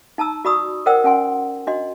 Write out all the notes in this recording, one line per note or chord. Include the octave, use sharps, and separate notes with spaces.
D#4 A5 A#5 E6
F#4 D5 B5 C#6 D#6 E6
A#4 C5 D5 F#5 G5 E6
C#4 F#5 G#5 C6
D4 F#4 D#5 C6